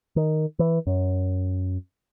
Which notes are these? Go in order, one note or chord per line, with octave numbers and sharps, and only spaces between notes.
D#3
E3
F#2